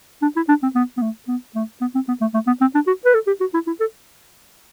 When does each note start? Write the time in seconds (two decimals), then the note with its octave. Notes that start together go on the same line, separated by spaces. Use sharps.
0.22 D4
0.36 E4
0.48 D4
0.63 C4
0.75 B3
0.97 B3
1.02 A3
1.28 B3
1.55 A3
1.81 B3
1.94 C4
2.08 B3
2.21 A3
2.34 A3
2.47 B3
2.61 C4
2.74 D4
2.87 F#4
3.05 B4
3.14 A4
3.27 G4
3.40 F#4
3.54 E4
3.67 E4
3.80 A4